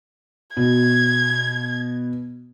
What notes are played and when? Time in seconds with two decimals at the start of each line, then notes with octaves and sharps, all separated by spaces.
0.57 B2 G#6